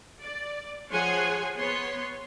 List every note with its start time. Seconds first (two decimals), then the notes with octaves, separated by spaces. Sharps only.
0.22 D5
0.92 F3 G#4 C#5 F#5 G#5 C6
1.59 B3 C#5 C6